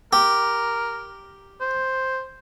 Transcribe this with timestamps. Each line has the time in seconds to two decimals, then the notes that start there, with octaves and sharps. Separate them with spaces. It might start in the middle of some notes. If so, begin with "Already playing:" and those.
0.13 G4 A#4
1.61 C5